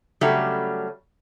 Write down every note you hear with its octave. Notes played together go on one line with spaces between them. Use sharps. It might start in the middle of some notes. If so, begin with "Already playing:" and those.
C#3 F#3 G3 A3 C#4 D4